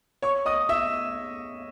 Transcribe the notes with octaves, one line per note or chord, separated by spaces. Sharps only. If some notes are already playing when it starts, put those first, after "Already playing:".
C#5 C#6
D#5 D#6
E5 E6